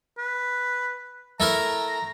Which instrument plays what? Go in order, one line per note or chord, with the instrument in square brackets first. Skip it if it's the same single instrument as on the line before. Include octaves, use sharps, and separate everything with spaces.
[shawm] B4
[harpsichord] A3 E4 A#4 [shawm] A#5